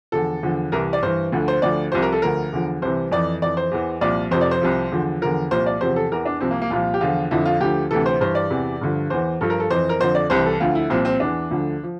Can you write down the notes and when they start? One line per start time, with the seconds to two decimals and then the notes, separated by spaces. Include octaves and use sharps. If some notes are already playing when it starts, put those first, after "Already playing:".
0.12 E2 D3 F3 A4
0.43 E2 D3 F3
0.72 C2 C3 E3 A#4
0.93 D5
1.02 G2 E3 C5
1.32 D2 D3 F3
1.48 C5
1.62 D2 D3 F3 D5
1.92 C2 C3 F3 C5
2.02 A#4
2.12 A4
2.22 D2 D3 F3 A#4
2.52 E2 D3 F3
2.82 C2 C3 E3 C5
3.11 F2 E3 D5
3.42 F2 E3 D5
3.57 C5
3.71 E2 E3
4.01 C2 A#2 F3 D5
4.31 F2 C3 F3 C5
4.41 D5
4.51 C5
4.61 C2 C3 F3
4.92 E2 D3 F3
5.21 E2 D3 F3 A#4
5.51 C2 A#2 F3 C5
5.66 D5
5.81 E2 C3 F3 C5
5.96 A4
6.12 E2 E3 A#4
6.26 D4
6.40 C2 C3 F3 C4
6.51 A#3
6.62 A#3
6.70 C2 A#2 F3 F4
6.94 G4
7.01 E2 D3 F3 F4
7.31 F2 D3 F3 E4
7.45 F4
7.60 D2 D3 F3 G4
7.91 D2 C3 E3 A4
8.06 C5
8.21 G2 E3 C5
8.35 D5
8.50 E2 C3 E3
8.81 G2 D3 F3
9.10 E2 E3 C5
9.41 G2 F3 A4
9.50 A#4
9.60 A4
9.70 F2 E3 C5
9.89 A#4
10.00 F2 D3 F3 C5
10.15 D5
10.30 C2 C3 E3 C5
10.46 A4
10.60 D2 D3 F3 F4
10.75 E4
10.90 C2 A#2 F3 C4
11.05 C4
11.20 E2 E3 D4
11.50 D2 D3 F3
11.83 F3